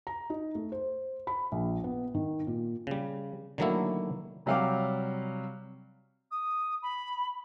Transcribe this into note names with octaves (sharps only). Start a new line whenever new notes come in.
A#5
D#4
A3
C5
B5
A#1
B3
D#3
A#2
C#3 G3
D3 D#3 F#3 A3 A#3 E4
C3 F#3 G3 F5 G5 D6
D#6
B5